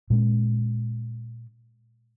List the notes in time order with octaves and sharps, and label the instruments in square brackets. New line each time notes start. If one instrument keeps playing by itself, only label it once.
[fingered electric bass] A#2 G#3 C#4